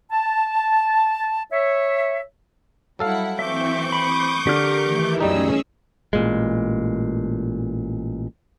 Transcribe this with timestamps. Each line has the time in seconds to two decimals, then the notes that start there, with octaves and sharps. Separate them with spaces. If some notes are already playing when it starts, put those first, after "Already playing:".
0.12 A5
1.52 C#5 E5
2.99 F#3 G3 E4 A4 F5 F#5
3.39 E3 C4 E5 C#6 D6 G6
3.92 B5 D#6
4.47 D3 G4 A#4 F6
4.85 D#3 E3 A3
5.20 C2 F#2 G3 C#4 D#4 G#4 D#5 E6
6.13 A1 A#2 G#3